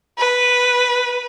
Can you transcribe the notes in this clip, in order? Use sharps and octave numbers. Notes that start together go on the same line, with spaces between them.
B4